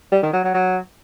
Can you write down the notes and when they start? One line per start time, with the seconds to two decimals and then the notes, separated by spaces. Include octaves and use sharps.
0.12 G3
0.22 D#3
0.33 F#3
0.44 F#3
0.54 F#3